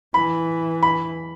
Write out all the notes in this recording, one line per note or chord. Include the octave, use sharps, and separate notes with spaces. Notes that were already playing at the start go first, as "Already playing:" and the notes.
E3 B5
B5